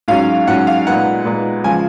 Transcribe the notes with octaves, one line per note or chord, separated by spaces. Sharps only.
G#2 F#3 C#4 F5
G#2 F#3 C#4 F#5
F5
A#2 G#3 B3 D#4 F#5
A#2 G#3 B3 D#4
C#3 F3 G#3 G#5